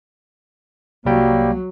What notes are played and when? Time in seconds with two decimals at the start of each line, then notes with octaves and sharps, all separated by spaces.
1.06 C2 F#3 G3 A#3 G5